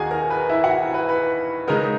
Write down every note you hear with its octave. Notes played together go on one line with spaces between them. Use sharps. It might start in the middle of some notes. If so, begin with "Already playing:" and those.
Already playing: D#2 D#3 A#3 D#4 F#4 G#4 G#5
A#4 A#5
B4
E4 E5
F#4 F#5
B4
B4
C#3 G#3 D#4 A#4